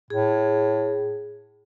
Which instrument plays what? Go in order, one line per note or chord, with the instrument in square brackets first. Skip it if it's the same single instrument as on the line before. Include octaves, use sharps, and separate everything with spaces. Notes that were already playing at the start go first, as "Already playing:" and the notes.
[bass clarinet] A2 [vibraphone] G#4